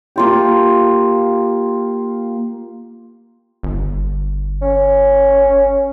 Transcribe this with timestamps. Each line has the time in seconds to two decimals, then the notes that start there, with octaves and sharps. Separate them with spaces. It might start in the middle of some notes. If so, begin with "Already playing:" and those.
0.16 A#3 F4 G4
3.63 G1
4.62 C#4